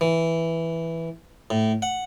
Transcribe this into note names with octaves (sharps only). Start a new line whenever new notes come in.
E3
A2
F#5